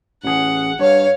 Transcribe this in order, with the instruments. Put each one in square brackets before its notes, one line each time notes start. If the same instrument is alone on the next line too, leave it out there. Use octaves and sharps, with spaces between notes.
[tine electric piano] A1 G#4 [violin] F#5
[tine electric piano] G2 [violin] C#5 F5